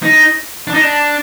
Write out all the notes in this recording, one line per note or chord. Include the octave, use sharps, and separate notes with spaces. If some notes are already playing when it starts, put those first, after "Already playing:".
D#4
D4
D#4
D4